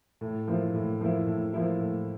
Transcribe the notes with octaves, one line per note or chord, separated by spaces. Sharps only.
A2
F3 A#3 E4
A2
F3 A#3 E4
A2
F3 A#3 E4
A2